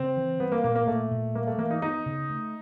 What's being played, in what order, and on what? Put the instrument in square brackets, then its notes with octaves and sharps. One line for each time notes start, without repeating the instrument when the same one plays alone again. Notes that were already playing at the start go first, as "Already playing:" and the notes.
Already playing: [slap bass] C#3 [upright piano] C4
[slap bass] E3
[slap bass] G3 [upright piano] B3
[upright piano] A#3
[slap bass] A#2 [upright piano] A#3
[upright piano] A#3
[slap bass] A#2 [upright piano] A3
[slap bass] A#2
[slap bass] G3 [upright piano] A#3
[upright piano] A3
[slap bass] E3 [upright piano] A#3
[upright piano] D#4
[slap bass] B3 [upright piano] D#4
[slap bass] C#3
A3